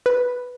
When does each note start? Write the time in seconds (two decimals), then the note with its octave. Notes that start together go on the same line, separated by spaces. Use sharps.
0.06 B4